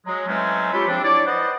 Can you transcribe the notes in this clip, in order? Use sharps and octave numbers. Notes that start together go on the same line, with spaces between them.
F#3 G#3
E3 F#3 G#3 A3 C4 C#4
C#4 F4 G4 A4 B5
C#3 F3 C4 D4
D4 E4 C#5 D5
B4 C5 D5 D#5 F#5